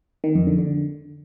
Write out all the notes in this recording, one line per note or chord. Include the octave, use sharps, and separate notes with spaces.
D#3
F2
D3
D3